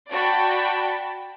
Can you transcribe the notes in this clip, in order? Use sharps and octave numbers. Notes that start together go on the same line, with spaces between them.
F#4 D5 G5 A5 B5 C#6